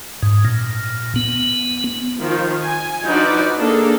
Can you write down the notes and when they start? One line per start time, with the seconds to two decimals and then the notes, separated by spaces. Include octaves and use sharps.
0.23 G#2
0.45 A#2
1.16 B3
2.20 D#3 F3 F4
2.64 G#5
3.05 F3 D4 D#4 F#4 B4 D5
3.57 A#3 D4 G#4 A4